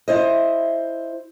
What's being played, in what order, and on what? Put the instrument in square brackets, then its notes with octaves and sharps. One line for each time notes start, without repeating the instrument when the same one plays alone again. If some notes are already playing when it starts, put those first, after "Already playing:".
[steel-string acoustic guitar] E4 C5 D#5